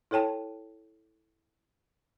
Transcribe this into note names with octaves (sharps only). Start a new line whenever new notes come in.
E4 A4 C#5 G5 A5